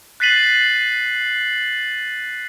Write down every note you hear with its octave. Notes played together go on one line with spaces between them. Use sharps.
F#6 A6 B6 C7 D#7 F#7